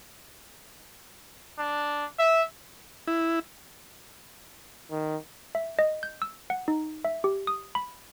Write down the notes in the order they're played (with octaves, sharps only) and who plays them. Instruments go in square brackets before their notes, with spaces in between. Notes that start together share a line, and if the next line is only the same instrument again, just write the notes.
[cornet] D4
E5
[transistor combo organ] E4
[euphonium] D#3
[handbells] E5
D#5
G6
E6
F#5
D#4
E5
G4
D#6
B5